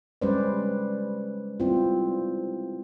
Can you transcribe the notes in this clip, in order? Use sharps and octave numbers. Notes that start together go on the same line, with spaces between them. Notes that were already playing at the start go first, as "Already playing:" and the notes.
G3 G#3 C#4 B4 C5 D5
G3 C4 E4 F4